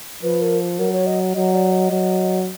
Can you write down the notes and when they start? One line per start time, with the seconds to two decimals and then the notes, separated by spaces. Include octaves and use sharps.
0.23 F3 B4
0.41 A#4
0.78 F#3 A#4
0.92 C#5
1.06 D#5
1.34 F#3 D#5
1.54 D5
1.72 D#5
1.91 F#3